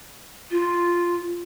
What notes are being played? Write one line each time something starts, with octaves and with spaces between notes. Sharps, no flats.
F4